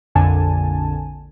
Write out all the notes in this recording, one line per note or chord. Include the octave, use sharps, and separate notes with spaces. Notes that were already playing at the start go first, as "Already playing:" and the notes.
A#1 F2 D3 G#5 A5